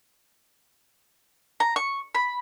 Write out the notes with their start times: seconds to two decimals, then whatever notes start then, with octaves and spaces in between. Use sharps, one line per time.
1.60 A#5
1.76 C#6
2.15 B5